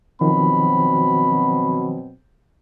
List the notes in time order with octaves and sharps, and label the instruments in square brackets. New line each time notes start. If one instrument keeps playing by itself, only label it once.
[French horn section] B2 F#3 C4 [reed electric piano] D#3 F3 [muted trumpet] B5